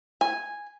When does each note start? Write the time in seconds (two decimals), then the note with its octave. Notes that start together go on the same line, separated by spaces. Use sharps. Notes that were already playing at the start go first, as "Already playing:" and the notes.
0.21 G#5